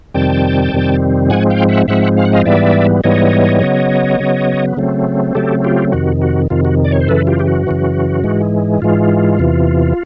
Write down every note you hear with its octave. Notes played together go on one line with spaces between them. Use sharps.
F2 C3 D#3 G3 C4 G5 A5
F2 C3 D#3 G3 C4
G#2 F3 G#3 C4 F#5 G#5
F5 G5
E5 F#5
G#2 F3 G#3 C4 E5 F#5
F5
F#5
D#5 F5
G#2 E3 G3 B3 D5 E5
G#2 E3 G3 B3 C#5 D#5
C#3 F#3 B3
C#3 F#3 B3
C#3 F#3 A3 C4
C#3 F#3 A3 C4 G4 A4
F4 G4
F2 C3 D#3 F#4
F#4
F2 C3 D#3 F4
F#4
D5
C#5
C5
F#2 C#3 E3 A4 B4
F4 G4
G4
F#4
F#2 C#3 E3
G#2 E3 G#3
G#2 E3 G#3 F4
E2 C3 E3